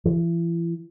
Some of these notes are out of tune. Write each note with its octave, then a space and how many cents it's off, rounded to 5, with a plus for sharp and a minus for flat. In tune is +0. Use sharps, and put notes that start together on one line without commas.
E3 +35